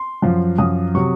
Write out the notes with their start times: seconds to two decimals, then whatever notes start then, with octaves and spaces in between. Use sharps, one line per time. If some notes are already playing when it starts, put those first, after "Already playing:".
Already playing: C6
0.22 F#2 F3
0.58 F#2 F3 D#6
0.95 C3 F#3 C#6